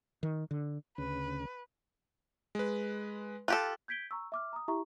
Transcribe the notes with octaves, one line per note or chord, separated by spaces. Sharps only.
D#3
D3
D2 C#3 B4
G#3 B4
F4 G4 A4 F#6
G6 G#6 B6 D7 G7
A#5 C#6 E6
E5 D6 F6
A#5 D#6
E4 G4 E5 A#5 C#6